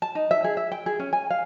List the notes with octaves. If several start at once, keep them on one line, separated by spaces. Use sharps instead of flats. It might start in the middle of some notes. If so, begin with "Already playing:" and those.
A5
D#4
E5
G#4
E5
G5
G#4
C#4
G#5
F5